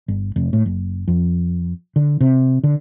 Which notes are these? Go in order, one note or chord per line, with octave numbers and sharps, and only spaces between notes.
G1
F1
A2
F#1
F2
D3
C3
D3